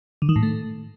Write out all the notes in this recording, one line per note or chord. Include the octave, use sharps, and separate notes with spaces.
D3
D#3
A2
A3